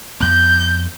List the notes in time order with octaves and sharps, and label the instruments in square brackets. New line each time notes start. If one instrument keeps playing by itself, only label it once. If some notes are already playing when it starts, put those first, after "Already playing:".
[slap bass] F2 B3 [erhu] G6